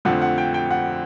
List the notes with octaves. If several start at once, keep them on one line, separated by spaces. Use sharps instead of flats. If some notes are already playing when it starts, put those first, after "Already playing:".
F2 D3 F3 A3 C4 F#5
F#5
G5
G5
F#5